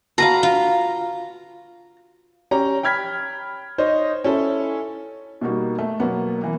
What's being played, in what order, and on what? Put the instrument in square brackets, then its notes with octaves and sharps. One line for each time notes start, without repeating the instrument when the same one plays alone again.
[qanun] F#4 B4 F5 [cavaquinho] A#5
[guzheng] F4
[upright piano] C#4 G4 A#5
G5 B5 F6 G#6 B6
D#4 C5 C#5 D#5
C#4 E4 A4
[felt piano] B2 G3 A#3 D#4 F#4
A3
B2 F#3 A#3 B3
E3 A#3